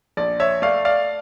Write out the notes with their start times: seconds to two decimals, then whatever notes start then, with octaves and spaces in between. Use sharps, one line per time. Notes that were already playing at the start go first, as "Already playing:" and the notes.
0.17 A#1 D5
0.40 C#5 E5
0.62 A3 D5 F5
0.85 D5 F5